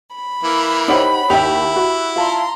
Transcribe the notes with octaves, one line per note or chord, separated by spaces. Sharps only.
B5
E3 A#3 E4
D#4 G4 C5 C#5 F#5 F#7
D#2 E4 G4 E5 F#5 F7
F#4
F4 A5 A#5 C6